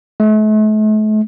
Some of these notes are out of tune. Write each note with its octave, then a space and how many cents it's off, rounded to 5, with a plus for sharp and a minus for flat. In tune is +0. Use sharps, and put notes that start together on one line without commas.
A3 -40